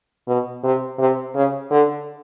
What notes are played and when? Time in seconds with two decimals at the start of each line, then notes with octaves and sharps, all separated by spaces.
0.28 B2
0.64 C3
0.99 C3
1.35 C#3
1.71 D3